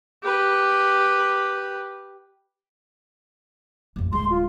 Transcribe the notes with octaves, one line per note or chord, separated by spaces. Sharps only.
G4 B4
A1 F2
D1 G#3 C6
F4